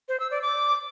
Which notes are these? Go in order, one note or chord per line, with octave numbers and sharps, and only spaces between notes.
C5
E6
D5
D6